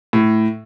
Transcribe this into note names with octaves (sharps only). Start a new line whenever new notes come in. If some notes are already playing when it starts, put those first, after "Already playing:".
A2